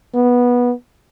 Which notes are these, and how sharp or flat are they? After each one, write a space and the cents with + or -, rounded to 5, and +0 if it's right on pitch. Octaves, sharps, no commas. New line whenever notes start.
B3 -15